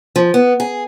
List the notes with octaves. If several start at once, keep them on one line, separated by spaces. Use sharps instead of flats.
F3
B3
G#4